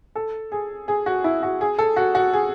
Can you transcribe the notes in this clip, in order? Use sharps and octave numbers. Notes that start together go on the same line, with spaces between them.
A4
G#4
G#4
F#4
E4
F#4
G#4
A4
F#4
F#4
G#4